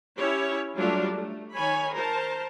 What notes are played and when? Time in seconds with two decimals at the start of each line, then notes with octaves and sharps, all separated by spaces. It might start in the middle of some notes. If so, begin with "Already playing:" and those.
0.19 C#4 E4 G4 C#5
0.76 F#3 G3 A3 D4 F4
1.13 A3
1.54 D#3 C#5 G#5 B5
1.95 A#4 C5 A5